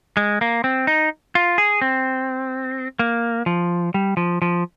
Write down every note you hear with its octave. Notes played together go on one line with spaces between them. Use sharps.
G#3
A#3
C4
D#4
F4
G#4
C4
A#3
F3
G3
F3
F3